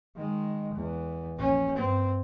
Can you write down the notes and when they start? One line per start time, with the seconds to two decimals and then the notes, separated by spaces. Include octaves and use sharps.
0.16 D#3 G#3
0.74 E2
1.37 A#1 C#4
1.76 G2 C4